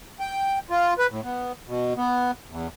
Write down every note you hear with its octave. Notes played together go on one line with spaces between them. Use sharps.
G5
F4
B4
A2
B3
B2
B3
E2